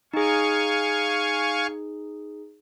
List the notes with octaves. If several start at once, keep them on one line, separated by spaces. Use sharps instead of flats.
D#4 G#4 F5 G#5 C#6